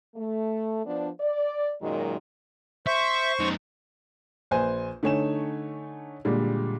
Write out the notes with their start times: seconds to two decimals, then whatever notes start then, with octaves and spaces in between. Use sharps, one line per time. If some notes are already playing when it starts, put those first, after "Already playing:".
0.15 A3
0.85 F3 B3 D4
1.20 D5
1.81 F#2 A#2 D#3 F#3 G#3
2.87 C5 E5 C#6
3.40 F#2 D#4
4.51 A#1 B4 C5 G#5
5.03 D3 A3 D#4 C#5 G#5 E7
6.25 A#2 D3 G3 G#3